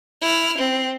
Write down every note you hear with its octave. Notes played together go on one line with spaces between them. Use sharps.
E4 F6
C4